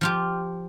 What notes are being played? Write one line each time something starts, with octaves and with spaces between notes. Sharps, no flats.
F3 F4 G4